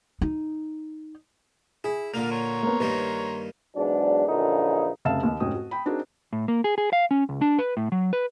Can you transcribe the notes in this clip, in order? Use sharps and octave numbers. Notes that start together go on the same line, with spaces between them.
D#4
E4 G#4
A#2 D3 A#3 A#4 F5 F7
C#5 A#5 C6
A#3 B3
G2 D#3 A#3 B4
E2 G#2 F#3 D4
A#1 A#2 D3 E3 C#4 D#4
F1 C#3 E5 F5 A5 E7
D#2 D#5
F1 G#2 C#4 F#4 G5 D#6
F#4
G5 B5
C4 D4 D#4 F#4 G#4 A#4
A2
A#3
G#4
G#4
F5
C#4
C#2
D4
B4
A2
F#3
B4